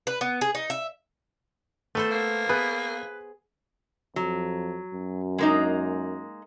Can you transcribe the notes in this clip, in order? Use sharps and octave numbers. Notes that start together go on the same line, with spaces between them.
B4
B3
G#4
D#4
E5
A3 B3 A4 C5
A#3
B3 G#4 B4
F2 F#3
F#2
G#3 A#3 D#4